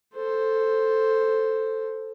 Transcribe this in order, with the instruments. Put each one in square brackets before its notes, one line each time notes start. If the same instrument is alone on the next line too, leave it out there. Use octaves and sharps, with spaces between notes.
[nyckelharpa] A4 C5